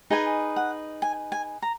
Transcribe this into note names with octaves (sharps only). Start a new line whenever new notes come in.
D#4 G#4 B4 D#5 G#5
F#5
G#5
G#5
A#5